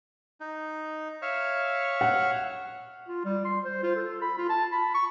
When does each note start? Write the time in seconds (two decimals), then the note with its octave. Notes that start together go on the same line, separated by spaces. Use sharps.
0.40 D#4
1.22 C#5 E5 F5
2.01 F#5
3.09 F4
3.25 G3
3.45 C6
3.64 C5
3.83 F4
3.96 A4
4.22 B5
4.38 F4
4.49 A5
4.72 B5
4.94 C#6